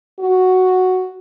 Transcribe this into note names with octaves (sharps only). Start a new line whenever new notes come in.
F#4